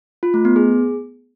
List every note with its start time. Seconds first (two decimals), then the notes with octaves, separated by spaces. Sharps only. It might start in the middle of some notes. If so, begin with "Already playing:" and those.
0.23 F4
0.34 A3
0.45 B3
0.56 G#4